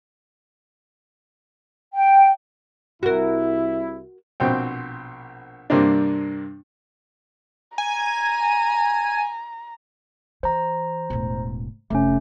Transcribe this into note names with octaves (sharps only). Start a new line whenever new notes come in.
G5
C2 E4 F#4 A#4
A#1 B2 C4 G5
G2 C3 A#3 C4 D4
G#5 A#5
E3 C5 A#5
E1 A2
F1 A3 C#4